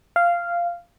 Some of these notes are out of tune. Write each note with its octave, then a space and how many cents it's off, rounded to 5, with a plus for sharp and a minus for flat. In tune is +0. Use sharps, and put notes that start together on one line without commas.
F5 -10